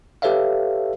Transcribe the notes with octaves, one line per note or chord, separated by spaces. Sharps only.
G4 A4 B4 C#5 E5 F5